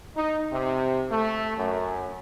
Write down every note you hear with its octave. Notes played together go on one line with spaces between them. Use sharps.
D#4
C3
A3
F#2